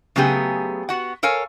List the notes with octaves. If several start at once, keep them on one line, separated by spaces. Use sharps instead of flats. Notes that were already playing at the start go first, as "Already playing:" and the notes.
C#3 F#3 A3 B3 G4 G#4
B3 F#4 F#5
A4 A#4 C#5 F5 G#5